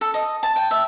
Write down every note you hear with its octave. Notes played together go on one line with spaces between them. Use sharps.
A4
D#5
A5
G5
E5